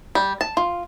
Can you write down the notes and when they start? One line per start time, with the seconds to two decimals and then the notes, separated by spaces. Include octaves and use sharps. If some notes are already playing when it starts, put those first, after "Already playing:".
0.15 G3
0.41 A5
0.57 F4